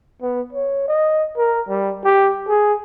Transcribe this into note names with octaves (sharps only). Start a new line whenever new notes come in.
B3
C#5
D#5
A#4
G3
G4
G#4